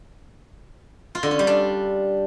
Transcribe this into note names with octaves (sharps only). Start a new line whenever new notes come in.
F4
D3
C#4
G3
D4